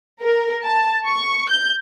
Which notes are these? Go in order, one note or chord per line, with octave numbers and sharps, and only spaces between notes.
A#4
A5
C#6
G6